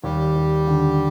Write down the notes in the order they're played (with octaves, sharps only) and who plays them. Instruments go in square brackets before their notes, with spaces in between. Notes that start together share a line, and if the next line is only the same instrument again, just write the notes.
[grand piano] D#2 [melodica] G3 G4
[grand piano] D#2
D3